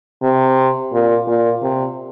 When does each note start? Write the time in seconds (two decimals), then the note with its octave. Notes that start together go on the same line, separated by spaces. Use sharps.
0.22 C3
0.93 A#2
1.27 A#2
1.62 C3